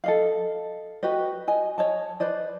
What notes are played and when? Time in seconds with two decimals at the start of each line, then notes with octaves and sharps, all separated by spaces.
0.04 A4 D#5 F5
1.03 F#4 G4 B4 D#5
1.48 D#5 G#5
1.78 C#5 D#5 A5
2.20 B4 C5 D5 D#5